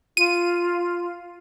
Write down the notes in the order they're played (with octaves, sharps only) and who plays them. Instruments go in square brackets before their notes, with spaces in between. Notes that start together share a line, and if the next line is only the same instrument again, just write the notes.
[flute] F4 [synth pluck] D#7